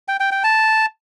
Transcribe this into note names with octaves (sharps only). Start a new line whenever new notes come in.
G5
G5
G5
A5